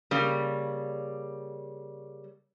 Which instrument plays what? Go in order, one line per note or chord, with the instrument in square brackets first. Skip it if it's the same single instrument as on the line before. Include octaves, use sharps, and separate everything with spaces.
[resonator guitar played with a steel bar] C#3 G3 A#3